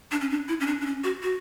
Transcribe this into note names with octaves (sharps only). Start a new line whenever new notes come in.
D4
C#4
D4
E4
C#4
D4
D4
C#4
F#4
F#4